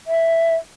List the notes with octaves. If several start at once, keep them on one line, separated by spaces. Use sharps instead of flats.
E5